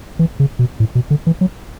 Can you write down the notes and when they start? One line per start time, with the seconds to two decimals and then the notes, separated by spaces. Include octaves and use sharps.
0.19 E3
0.40 C#3
0.59 B2
0.80 A2
0.95 B2
1.10 D3
1.27 E3
1.41 F#3